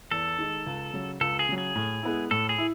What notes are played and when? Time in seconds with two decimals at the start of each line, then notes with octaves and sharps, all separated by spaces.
0.11 E2 A4
0.39 D#3 G#3 D#4
0.66 C#2
0.93 C#3 F#3
1.21 C#2 A4
1.39 G#4
1.49 C#3 F#3
1.58 G#4
1.76 A2
2.03 G#3 B3 E4
2.31 A2 A4
2.49 G#4
2.58 E4